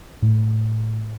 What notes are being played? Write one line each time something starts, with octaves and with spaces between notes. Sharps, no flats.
A2